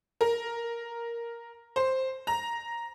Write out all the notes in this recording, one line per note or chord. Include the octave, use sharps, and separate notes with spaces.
A#4
C5
A#5